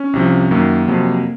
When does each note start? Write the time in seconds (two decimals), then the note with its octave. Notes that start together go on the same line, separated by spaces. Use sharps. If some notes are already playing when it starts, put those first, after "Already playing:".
Already playing: C#4
0.13 C2 C3 F3
0.51 F#2 D#3 F#3 A#3
0.88 F2 C3 F#3